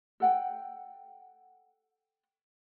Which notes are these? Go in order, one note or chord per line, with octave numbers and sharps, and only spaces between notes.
A4 F#5 G5